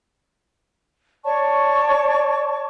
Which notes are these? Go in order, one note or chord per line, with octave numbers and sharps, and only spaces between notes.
C#5 D5 A5 C#6